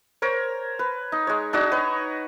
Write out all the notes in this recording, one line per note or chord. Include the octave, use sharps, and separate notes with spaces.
A#4 C5 C#5
B4
D#4
G#3 C#5
D4 D#4 F#4 D5
F#4 B4 C#5 C#6